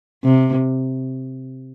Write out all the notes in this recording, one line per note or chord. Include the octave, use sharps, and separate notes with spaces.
C3